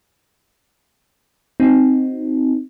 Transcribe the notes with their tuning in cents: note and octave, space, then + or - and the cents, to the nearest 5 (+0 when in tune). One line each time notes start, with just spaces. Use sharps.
C4 -5 D#4 +0 F#4 +0